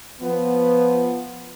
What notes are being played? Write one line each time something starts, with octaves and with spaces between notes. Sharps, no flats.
F3 B3